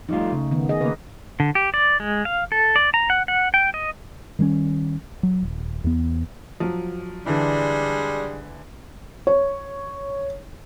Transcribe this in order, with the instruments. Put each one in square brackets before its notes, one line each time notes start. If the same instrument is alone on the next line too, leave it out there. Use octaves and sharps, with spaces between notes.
[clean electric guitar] F2 G3 F4 [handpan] A3 D#4
[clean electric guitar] C#3
[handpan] D#3 B3
G#4 D#5
[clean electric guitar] C#3 A#3 [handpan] A#4 B4
[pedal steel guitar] D3
G4
D5
G#3
F5
A4
D5
A#5
F#5
F#5
G5
D#5
[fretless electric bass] D#3 G3 G#3 C#4
F#3
D#1
E2 B3
[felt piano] F3 F#3
[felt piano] D3 E3 [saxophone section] G3 G#3 D4
[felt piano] C#5